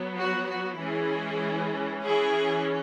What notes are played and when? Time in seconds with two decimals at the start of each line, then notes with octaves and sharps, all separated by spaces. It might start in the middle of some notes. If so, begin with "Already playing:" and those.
Already playing: F#3 B3
0.16 F#4
0.47 F#4
0.78 E3 G#3 C#4 E4 G#4
2.03 E3 C#4 E4 G#4